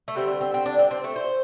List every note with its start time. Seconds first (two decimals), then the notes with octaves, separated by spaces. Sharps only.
0.08 A3
0.15 D3 G3 C4
0.28 C4
0.41 C4
0.54 C4
0.66 D4
0.79 C4
0.91 C4
1.04 A3
1.16 C5